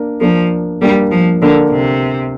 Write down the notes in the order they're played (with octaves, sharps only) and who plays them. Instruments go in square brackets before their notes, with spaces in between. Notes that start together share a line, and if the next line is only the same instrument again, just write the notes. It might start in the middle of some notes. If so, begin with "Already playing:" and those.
Already playing: [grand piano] A#3 D4 A#4
[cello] F3 [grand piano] A#3 D4 A#4
[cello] G3 [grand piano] A#3 D4 A#4
[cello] F3
[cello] D3 [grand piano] A#3 D4 A#4
[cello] C3